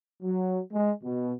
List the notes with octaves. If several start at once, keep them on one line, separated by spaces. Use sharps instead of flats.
F#3
G#3
B2